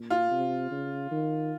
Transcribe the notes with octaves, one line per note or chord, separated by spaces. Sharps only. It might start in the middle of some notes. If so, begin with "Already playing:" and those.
Already playing: A#2
F4
C3
C#3
D#3